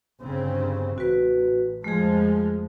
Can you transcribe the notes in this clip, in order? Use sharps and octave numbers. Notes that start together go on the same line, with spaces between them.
G1 C#3 C4
A1 F#4 B4
F2 F3 G#3 A3 G#4